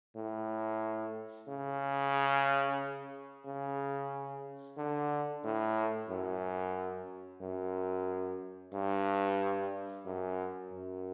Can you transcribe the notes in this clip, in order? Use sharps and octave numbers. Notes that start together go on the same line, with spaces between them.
A2
C#3
C#3
D3
A2
F#2
F#2
G2
F#2
F#2